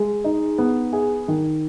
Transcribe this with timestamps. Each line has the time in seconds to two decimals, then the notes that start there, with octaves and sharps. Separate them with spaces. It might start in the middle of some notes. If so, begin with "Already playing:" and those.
Already playing: G#3
0.24 D#4
0.58 B3
0.93 G#4
1.28 D#3